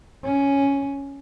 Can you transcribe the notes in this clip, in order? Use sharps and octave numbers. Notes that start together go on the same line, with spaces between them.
C#4